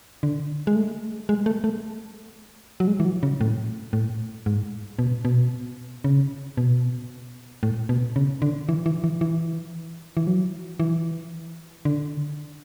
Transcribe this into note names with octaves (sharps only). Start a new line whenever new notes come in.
D3
G#3
A3
G#3
A3
A3
F#3
G#3
E3
F#3
C#3
A2
A2
G#2
B2
B2
C#3
B2
A2
B2
C#3
D3
E3
E3
E3
E3
E3
F#3
E3
D3